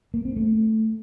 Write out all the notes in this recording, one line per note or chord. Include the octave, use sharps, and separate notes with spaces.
A#3
C4
A3